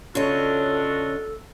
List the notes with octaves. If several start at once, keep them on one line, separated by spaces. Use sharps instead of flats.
C#3 D4 F4 F#4 A4 C#5 D#5